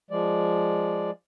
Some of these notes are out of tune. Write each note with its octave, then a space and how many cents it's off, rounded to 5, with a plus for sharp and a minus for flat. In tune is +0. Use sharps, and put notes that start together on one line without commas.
F3 +0 G#3 +0 D5 +0